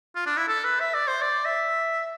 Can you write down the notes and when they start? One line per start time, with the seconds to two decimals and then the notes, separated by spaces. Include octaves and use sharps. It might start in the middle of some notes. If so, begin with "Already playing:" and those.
0.15 F4
0.26 D4
0.37 E4
0.48 A4
0.64 B4
0.80 E5
0.94 D5
1.08 C5
1.22 D5
1.45 E5